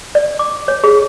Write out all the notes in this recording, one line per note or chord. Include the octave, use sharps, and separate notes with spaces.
D5
D6
C#5
G#4